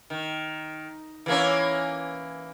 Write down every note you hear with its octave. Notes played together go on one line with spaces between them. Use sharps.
D#3
E3 A#3 C#4